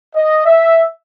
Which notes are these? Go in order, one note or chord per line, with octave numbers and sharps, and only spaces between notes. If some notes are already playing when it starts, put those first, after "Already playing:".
D#5
E5